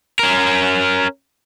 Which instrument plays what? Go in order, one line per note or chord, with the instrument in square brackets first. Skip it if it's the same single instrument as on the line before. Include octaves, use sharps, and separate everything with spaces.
[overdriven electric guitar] C#4 A#4